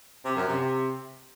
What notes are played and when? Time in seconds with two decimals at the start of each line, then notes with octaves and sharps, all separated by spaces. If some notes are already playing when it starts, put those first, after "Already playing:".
0.24 C3
0.36 F#2
0.47 C3